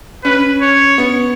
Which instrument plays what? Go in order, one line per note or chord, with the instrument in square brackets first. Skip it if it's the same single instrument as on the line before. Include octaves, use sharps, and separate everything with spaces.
[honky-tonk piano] C#4 [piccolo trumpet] B4
[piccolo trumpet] C#5
[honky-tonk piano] B3